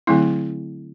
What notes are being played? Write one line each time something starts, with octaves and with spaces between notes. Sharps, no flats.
D3 F#3 A3 C4 E4